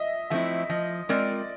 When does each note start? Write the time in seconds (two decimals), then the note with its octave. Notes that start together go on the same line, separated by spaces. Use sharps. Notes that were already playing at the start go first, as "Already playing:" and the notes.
Already playing: D#5 E5
0.30 F3 A3 C4 E4 E5
0.69 F3 D#5
1.09 G#3 C4 F4 A#4 D5